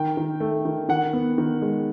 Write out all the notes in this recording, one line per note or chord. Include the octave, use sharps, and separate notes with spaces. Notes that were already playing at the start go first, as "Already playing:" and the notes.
Already playing: D#3 G5
D#3
A3
D#3
D#3 F#5
B3
D#3
G#3